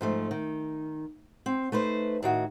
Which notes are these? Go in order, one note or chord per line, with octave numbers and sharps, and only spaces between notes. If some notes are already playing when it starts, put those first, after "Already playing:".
G#2 F3 A3
D#3
C4
A3 D#4 B4 C5
A2 D#3 F#4